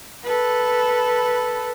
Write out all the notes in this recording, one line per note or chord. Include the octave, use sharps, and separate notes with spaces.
A4 B4